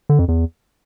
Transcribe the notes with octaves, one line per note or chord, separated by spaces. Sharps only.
D3
F2
E2